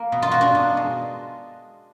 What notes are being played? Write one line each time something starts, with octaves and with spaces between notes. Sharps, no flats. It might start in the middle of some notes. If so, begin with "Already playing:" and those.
Already playing: A#3
B2
F4
A#3 F#4
D4 F4
B2
G#3